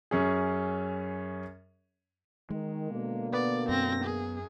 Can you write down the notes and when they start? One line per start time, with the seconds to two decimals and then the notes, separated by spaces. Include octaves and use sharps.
0.11 F#2 C#4 G#4
2.50 D#3 G#3
2.91 B2 D3 A#3
3.33 B3 D5
3.69 F#2 C4 A#6
4.04 G#4